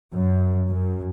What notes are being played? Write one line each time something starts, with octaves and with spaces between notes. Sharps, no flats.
F#2
F#2